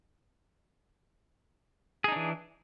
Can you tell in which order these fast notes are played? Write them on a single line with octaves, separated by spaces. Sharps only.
G#4 D#4 D4 E3